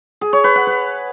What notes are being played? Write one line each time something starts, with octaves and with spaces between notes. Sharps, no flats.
G#4
C#5
B4
F#5
B4